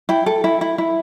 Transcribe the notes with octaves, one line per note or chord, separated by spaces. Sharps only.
E4 G5
A4
E4
E4
E4